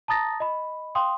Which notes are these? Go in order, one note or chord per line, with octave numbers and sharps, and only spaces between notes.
A5 A#5 D#6 A6 A#6
D#5 B5
F5 G5 C6 D#6